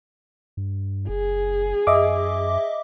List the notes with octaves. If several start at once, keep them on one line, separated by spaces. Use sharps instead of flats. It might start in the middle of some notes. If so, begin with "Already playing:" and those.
G2
F#1 G#4
F#2 D#5 E5 D6